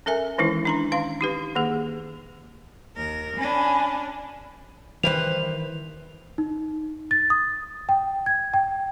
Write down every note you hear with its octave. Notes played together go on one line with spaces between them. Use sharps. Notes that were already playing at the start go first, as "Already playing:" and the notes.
C#4 A4 A#4 E5 G#5
D#3 E3 G#3 C#4 D#4 E4
D4 A#5 C6
D#3 C#4 F5 C6
D#4 G4 B4
D#3 A#3 G#4
D#2 A#4
C#4 D4 G#5 B5
D#3 E3 G3 B4 C5 F7
D#4
A6
D#6
G5
G#6
G5